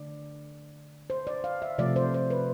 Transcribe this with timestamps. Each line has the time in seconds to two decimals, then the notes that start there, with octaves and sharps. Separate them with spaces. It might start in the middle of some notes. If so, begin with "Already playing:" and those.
Already playing: D3 A3 D5
1.10 C5
1.27 D5
1.44 F5
1.62 E5
1.78 C3 F3 A3 D5
1.96 C5
2.14 C5
2.30 B4